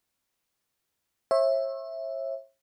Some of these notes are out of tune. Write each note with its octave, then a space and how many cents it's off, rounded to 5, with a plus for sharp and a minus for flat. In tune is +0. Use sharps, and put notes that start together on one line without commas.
C#5 -40 E5 +0